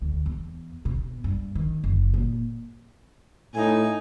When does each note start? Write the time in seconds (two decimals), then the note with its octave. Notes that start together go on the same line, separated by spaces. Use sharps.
0.02 D2
0.26 E2
0.85 B2
1.24 G2
1.55 D#3
1.84 F#1
2.14 A#2
3.55 A2 D#4 G#5